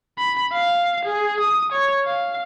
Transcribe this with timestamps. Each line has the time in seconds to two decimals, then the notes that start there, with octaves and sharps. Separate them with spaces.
0.19 B5
0.53 F5
1.05 G#4
1.40 D#6
1.72 C#5
2.05 F5